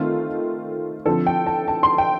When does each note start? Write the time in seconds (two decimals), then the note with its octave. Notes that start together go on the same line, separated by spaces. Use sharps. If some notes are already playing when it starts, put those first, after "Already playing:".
Already playing: D#3 A3 C4 F4
1.05 D3 F3 C4 A4
1.26 G5
1.46 A5
1.68 A5
1.83 C6
1.98 G5